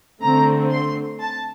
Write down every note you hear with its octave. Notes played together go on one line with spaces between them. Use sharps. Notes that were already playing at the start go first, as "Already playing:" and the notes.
D3 A3 C4 A#5
C6
A5